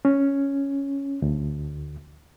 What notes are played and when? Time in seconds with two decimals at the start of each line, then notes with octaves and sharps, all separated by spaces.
0.05 C#4
1.22 D2